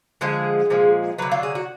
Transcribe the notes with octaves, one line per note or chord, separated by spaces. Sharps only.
D3 F3 G#3 G#4
A#2 F3 G#3
D3 F#3 B4
F4
G#4
F#4